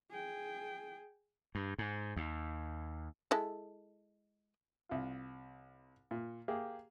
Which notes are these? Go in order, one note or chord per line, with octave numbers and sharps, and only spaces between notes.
G#4 G5
G2
G#2
D#2
G#3 E4 A4
C2 F4
A#2
A#3 G4 G#4